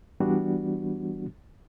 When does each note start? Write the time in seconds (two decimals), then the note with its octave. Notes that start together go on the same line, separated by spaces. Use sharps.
0.20 E3 G3 B3 D4 F#4